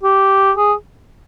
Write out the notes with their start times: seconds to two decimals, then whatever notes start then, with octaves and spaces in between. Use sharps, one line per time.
0.03 G4
0.57 G#4